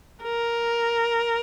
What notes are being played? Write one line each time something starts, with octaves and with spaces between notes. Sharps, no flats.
A#4